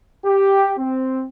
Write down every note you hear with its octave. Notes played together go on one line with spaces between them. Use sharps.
G4
C4